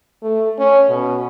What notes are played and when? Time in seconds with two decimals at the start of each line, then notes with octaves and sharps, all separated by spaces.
0.22 A3
0.58 C#4
0.89 B2